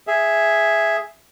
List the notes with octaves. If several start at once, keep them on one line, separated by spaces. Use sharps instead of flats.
G#4 E5